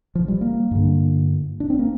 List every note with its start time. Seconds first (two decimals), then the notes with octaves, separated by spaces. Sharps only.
0.15 F3
0.28 G3
0.41 A#3
0.71 G2 D3
1.60 D4
1.70 C4
1.79 A#3